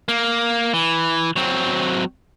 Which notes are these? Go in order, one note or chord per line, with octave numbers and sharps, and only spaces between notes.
A#3
E3
F#3 C4